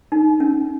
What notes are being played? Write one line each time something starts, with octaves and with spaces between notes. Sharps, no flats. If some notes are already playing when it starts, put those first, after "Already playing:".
D#4
C#4